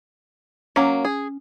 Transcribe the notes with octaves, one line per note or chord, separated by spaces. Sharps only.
F#3 A#3 C#4
G#4